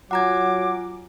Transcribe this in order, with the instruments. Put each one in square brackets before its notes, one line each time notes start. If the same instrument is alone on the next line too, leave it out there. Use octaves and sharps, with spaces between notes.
[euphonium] F#3 [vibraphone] F4 G#5 [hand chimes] F#5 A#5 G#6 [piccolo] D6